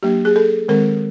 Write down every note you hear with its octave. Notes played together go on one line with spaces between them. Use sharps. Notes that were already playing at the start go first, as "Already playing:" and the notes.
F#3 A#3 D4 G4
G#4
A4
D#3 G#3 C4 A#4